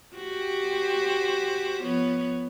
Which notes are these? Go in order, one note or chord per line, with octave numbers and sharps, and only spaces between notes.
F#4 G4 C5
F3 B3 C#5